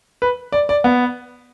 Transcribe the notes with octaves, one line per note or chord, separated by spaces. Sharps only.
B4
D5
D5
B3